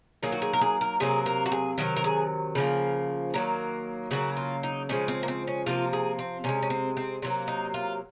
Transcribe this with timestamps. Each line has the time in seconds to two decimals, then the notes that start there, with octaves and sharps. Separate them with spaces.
0.23 D#3 F#3 A#3 G#4
0.32 F#4
0.42 G#4
0.53 A#4
0.61 G#4
0.81 A#4
1.00 C3 F#3 A#3 G#4
1.26 A#4
1.46 F#4
1.52 G#4
1.78 C3 D#3 F#3 A#4
1.97 A#4
2.04 G#4
2.55 C#3 F3 A#3
3.34 D#3 F#3 A#3
4.11 C#3 F#3 A#3 F#4
4.37 F4
4.63 D#4
4.89 C#3 F3 G#3 C#4
5.08 C4
5.23 A#3
5.28 C4
5.47 C#4
5.66 C3 F3 A#3 F4
5.93 G#4
6.19 C4
6.44 C3 D#3 G#3 C#4
6.63 C#4
6.70 C4
6.97 C4
7.22 C3 F#3 A#3 C4
7.48 D#4
7.74 F4